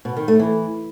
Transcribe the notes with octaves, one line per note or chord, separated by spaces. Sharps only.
B2
D#3
A3
E3